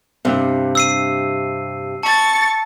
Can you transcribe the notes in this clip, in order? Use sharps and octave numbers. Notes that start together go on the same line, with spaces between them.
G2 C3
E6 C7 D#7
A5 C#6 A6